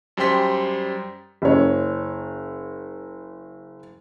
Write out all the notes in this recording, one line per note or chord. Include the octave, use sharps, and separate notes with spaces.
F#2 G3 C5 G5 C6 B6
F#1 C#5